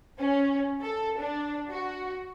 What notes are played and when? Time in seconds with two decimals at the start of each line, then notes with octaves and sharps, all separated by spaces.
0.19 C#4
0.81 A4
1.18 D4
1.70 F#4